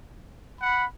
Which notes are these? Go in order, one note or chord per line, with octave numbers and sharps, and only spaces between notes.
F#5 B5